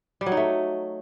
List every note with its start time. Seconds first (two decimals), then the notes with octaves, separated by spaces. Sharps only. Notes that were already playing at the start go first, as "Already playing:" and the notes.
0.21 G3
0.26 F#3
0.32 D#4
0.37 A3